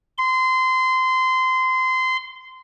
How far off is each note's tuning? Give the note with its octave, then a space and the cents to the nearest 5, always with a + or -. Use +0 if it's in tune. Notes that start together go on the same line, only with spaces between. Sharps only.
C6 -20